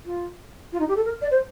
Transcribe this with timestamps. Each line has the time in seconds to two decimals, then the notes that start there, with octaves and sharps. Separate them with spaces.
0.06 F4
0.73 F4
0.80 D#4
0.89 G4
0.96 A4
1.05 A#4
1.22 D5
1.31 C5